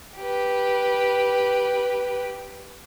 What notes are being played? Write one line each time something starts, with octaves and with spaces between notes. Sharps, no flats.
G4 B4